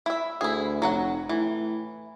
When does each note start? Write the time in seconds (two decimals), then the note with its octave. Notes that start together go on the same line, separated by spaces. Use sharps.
0.06 E4 E5
0.41 D2 E4 G#4
0.82 F1 F#3 F#4 F#5
1.29 A2 E3